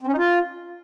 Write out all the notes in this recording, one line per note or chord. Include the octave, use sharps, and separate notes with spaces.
C4
C#4
D#4
F4